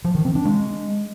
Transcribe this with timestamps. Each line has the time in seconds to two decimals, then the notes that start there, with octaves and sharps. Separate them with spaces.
0.05 F3
0.15 D#3
0.25 C4
0.35 D4
0.45 G#3